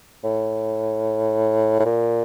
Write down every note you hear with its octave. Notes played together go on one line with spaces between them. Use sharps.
A2
A2
A#2